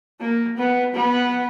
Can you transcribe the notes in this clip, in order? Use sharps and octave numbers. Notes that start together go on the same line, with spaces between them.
A#3
B3
B3